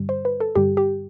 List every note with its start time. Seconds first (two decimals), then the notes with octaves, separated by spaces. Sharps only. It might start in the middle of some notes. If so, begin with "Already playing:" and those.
Already playing: G2 D3 G3
0.09 C5
0.25 B4
0.40 A4
0.56 G2 D3 G3 G4
0.77 G4